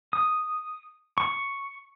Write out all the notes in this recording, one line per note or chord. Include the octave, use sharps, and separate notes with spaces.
D#6
C#6